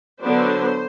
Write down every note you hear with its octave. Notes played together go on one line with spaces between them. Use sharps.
D3 F#3 B3 D4 C5